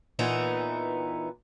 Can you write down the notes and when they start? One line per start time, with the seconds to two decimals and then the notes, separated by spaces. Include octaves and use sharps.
0.19 A#2 E3 B3 D#4